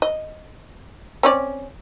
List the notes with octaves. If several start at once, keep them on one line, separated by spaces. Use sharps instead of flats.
D#5
C4 C#4 D5